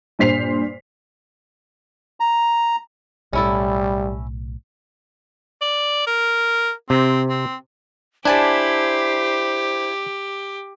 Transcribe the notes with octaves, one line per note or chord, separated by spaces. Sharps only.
G2 A#2 C5 B6 C7 F7
A#5
B1 A2 G3 C#4 E4 A4
D5
A#4
C3 C4
C4
D4 E4 G4 C5 G#5 A5